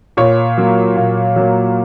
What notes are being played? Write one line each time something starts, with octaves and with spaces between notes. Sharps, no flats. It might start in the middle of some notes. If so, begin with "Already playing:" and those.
A#2 C#5
F#3 A#3
A#2
F#3 A#3